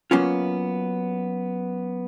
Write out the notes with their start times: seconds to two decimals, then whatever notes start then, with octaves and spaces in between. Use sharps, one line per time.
0.11 F#3 A#3 B3 C#4 F4